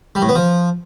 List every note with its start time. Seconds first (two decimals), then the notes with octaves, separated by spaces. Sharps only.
0.15 G3
0.22 A2
0.29 B3
0.35 F3